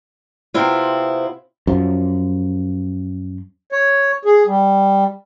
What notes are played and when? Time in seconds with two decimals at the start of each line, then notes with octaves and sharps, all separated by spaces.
0.54 C3 B3 C4 E4 F4
1.67 F#2 F3
3.72 C#5
4.25 G#4
4.47 G3